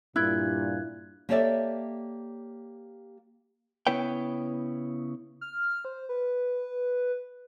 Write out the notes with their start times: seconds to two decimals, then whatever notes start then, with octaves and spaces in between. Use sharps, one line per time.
0.16 G2 A#2 E4 F#6 G#6
1.29 A#3 G4 A4 C#5 D5 E5
3.87 C#3 B3 E4 B4 C#5 G5
5.41 F6
5.85 C5
6.09 B4